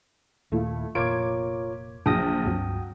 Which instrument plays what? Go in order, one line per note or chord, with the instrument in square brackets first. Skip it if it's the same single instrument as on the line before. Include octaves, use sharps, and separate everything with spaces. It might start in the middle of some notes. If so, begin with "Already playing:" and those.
[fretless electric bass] D#2 A#2 [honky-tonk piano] A3 E4 F4
[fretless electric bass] F1 A#2 [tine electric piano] F4 A#4 C#5 [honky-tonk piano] D6 G#6 D7
[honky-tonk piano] A#1 F#3 A#6 [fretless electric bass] D4 [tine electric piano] G5 D#6
[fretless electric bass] C#2 G2 C4 [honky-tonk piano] F#3